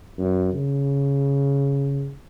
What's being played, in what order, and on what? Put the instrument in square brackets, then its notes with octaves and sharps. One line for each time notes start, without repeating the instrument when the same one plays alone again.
[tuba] F#2
C#3